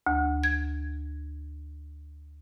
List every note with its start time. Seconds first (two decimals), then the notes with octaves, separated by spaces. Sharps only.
0.07 D2
0.44 G#6